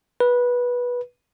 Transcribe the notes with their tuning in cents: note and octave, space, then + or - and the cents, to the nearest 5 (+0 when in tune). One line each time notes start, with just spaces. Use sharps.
B4 -15